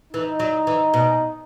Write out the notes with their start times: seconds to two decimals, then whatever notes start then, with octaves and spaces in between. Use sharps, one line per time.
0.13 E3 D#4
0.40 F#3
0.67 E3
0.94 B2